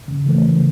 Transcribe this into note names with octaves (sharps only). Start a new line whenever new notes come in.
C#3
E3 A3
C#3